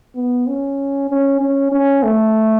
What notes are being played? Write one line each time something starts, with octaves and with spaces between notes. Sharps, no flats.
B3
C#4
C#4
C#4
C#4
A3